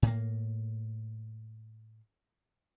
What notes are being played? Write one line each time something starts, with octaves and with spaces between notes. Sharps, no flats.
A2 A#3